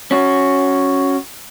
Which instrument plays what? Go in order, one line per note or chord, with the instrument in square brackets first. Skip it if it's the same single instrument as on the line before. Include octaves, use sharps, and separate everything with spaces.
[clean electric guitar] C#4 F#4